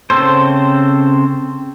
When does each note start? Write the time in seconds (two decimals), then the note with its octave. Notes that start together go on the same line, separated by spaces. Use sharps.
0.10 C#3 C4 A4 C5